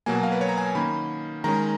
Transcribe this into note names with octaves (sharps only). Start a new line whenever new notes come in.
B2 F#3 A#3 G#5
F#5
F5
B4
C#5
A#5
G#5
D#3 A#3 C#4 B5
D#3 G#3 C#4 A#5